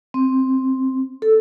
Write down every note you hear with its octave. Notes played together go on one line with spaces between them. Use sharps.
C4
A4